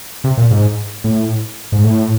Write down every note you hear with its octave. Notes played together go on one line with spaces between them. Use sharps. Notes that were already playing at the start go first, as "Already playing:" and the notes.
C3
A#2
G#2
A2
G#2
A2